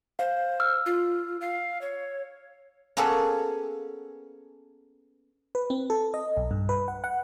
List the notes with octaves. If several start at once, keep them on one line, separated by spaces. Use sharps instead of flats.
C5 F5
E6 F6
F4
F5
C#5
A#3 B3 C#4 G#4 A4 B4
B4
C4
A4
D#5
B1
G2
B4
F#5
F#5